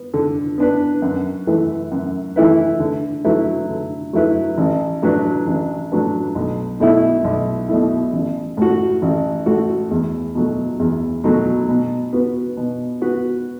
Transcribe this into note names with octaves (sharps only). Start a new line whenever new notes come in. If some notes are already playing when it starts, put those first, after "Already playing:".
Already playing: B3
D3
B3 D4 B4
F#2
E3 A3 E4 B4
F#2
E3 A3 E4 B4
D3
F#3 A3 E4 B4
D3
F#3 A3 E4 B4
A1
A2 F#3 D4 B4
A1
A2 F#3 D4 B4
B1
B2 A3 E4
B1
B2 A3 E4
A1
A2 A3 F#4
A1
A2 A3 F#4
E2
B2 F#3 A3
E2
B2 F#3 A3
B2
B3 F#4 B4
B2
B3 F#4 B4